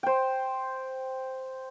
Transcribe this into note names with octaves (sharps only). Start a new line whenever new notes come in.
C5 G5